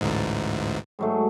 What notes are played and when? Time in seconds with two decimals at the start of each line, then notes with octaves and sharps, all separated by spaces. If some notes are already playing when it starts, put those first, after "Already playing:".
0.01 A1 D2 G#2
0.99 G#2 F#3 A3